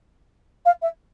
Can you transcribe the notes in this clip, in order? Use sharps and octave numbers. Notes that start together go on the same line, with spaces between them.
F5
E5